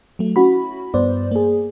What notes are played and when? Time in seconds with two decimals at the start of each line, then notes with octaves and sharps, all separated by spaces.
0.19 F#3 A3
0.36 C#4 E4 F#4 B5
0.94 G2 B3 C5 D5
1.31 A#3 G#4